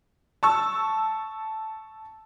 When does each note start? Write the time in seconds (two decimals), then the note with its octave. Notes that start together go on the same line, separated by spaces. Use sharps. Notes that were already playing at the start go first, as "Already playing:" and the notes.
0.43 A5 C#6 E6